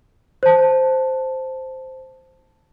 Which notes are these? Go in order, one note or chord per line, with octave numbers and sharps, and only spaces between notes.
C5 A5